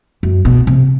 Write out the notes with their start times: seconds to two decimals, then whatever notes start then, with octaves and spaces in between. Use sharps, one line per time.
0.23 F#2
0.45 B2
0.67 C3